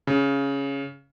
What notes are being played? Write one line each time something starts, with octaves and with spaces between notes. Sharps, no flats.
C#3